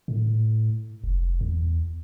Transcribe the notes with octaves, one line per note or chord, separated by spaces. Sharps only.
A2
F1
E2